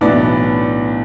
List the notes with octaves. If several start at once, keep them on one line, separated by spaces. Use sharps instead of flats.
B1 A2 E3 B3 D4 D5